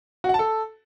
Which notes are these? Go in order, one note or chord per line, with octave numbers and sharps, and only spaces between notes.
F#4
F#5
A5
A4